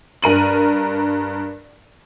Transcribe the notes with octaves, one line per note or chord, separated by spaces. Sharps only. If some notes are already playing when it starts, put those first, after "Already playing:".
G2 A#4 D#7 F#7